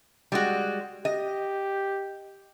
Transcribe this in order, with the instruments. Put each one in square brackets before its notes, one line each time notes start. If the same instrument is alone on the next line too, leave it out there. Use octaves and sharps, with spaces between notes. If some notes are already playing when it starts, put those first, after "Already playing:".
[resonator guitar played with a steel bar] G3 G#3 F#4
[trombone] G4 [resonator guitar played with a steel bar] D#5